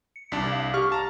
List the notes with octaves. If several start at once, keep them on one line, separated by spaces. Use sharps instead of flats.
C#7
C2 D4 A5 B6
F5
G4 C#6 F6
A5 A#5